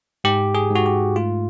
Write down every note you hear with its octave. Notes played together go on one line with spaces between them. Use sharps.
G#2 G4
G#4
G#2 F#4
G4
A3 F4